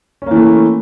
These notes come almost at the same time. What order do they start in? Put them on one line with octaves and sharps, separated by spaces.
C#4 A#3 E3 A3